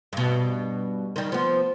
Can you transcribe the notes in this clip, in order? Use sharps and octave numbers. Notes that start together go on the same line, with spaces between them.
G2 B2
D#3 G3
F3 B3